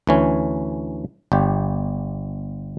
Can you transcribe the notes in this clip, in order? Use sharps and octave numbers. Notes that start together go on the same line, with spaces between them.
D2 E3 C#4
G1 G4